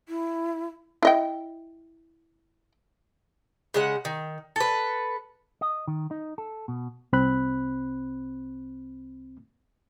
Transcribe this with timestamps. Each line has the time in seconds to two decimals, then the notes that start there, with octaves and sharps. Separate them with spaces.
0.09 E4
1.03 E4 D#5 G5
3.74 C#3 G#3 F#5
4.05 D#3
4.56 A4 B4
5.61 D#5
5.87 D#3
6.11 D#4
6.38 A4
6.68 B2
7.13 C2 C4 B5 F#6